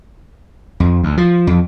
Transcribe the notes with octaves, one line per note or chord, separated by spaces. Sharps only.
F2
D2
F3
F2